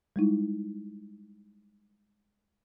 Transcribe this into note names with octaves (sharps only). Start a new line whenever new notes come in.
G3 G#3 D#4 E4